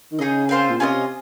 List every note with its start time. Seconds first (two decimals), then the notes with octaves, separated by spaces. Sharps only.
0.12 D#3
0.19 C#3 D#4 G#4 D#5
0.49 C4 F4 C5 F5
0.70 A#2
0.80 C3 C#4 F4 C5 D#5